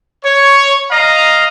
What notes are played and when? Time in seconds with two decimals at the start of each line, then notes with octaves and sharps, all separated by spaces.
0.24 C#5
0.91 D#5 F5 A#5